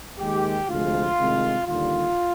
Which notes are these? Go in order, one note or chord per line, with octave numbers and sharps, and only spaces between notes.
D#2 D#3 G#3 G4
D2 C3 F3 G#3 F4
C2 C3 D#3 G#3
D#2 D3 G3 F4